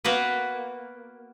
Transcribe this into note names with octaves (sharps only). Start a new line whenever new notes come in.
A#3 B3 F#4 B4